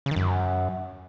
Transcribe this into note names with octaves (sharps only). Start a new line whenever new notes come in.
C#3
D#3
F#2